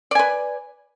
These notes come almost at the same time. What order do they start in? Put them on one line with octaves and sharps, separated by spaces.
D5 G#5 B4